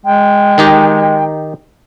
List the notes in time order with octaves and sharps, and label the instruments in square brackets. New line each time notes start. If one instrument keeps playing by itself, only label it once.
[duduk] G#3 [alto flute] G5
[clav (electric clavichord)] D#3 D#4 G4